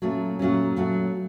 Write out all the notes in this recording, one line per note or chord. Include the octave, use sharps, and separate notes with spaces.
A#2 F#3 A3 C#4
A#2 F#3 A3 C#4
A#2 F#3 A3 C#4